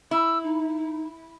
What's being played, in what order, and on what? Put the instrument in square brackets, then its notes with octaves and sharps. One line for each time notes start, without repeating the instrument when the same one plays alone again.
[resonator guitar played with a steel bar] E4 [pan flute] E6
[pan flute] D#4